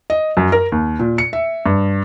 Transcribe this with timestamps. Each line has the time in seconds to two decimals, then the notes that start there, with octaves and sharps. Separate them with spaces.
0.10 D#5
0.37 F#2
0.52 A#4
0.72 D#2
0.99 A#2
1.18 C#7
1.33 E5
1.66 G2